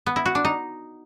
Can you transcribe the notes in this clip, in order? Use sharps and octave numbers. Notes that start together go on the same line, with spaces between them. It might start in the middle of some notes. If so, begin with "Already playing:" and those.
B3
E4
F#4
D4
D#4